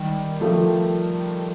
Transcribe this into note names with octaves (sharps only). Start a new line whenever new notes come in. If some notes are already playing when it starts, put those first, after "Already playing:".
Already playing: D#3 G3
F3 A3